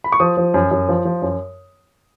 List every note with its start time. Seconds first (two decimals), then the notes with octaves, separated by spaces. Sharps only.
0.04 B5
0.12 C#6
0.20 F3 D#6
0.37 F3
0.54 F#2
0.71 F#2
0.89 F3
1.05 F3
1.22 F#2